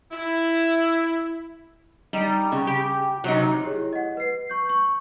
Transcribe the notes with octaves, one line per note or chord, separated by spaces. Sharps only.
E4
G3 D#4
C#3
G4
C3 F#3 D#4
E4 G4 G#4 C#5
D#5 F#5
B4 C7
C#6 G6
C#6